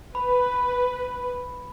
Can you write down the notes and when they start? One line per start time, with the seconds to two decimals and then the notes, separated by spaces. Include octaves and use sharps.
0.15 B4 B5